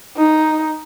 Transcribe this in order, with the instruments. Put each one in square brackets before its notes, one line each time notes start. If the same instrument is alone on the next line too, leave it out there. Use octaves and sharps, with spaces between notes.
[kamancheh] D#4